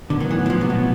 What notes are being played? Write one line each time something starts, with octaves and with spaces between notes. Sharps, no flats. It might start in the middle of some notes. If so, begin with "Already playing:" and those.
A2 D3 F#3 B3
D#3
E3
E3
F3
C3
B2